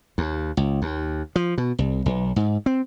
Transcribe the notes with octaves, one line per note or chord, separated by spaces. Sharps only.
D#2
C#2
D#2
F3
B2
C2
B1
G#2
C4